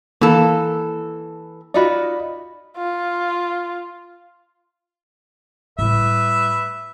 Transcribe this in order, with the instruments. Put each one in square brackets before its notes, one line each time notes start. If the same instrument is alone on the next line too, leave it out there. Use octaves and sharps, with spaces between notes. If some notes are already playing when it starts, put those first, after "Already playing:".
[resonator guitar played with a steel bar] E3 A4 [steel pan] A#3
[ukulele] D#4 F4 F#4 [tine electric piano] D5 D#5 B5
[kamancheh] F4
[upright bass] A2 G3 [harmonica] B4 E5